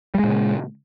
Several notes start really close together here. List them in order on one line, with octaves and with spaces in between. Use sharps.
G3 G#3 A#2 C#3